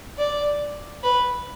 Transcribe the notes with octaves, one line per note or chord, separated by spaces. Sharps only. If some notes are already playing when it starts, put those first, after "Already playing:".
D5
B4